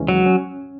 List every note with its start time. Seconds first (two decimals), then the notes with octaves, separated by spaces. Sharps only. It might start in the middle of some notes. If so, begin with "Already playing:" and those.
Already playing: D#2 C#3 E3 G#3 C#4
0.08 F#3
0.26 C#4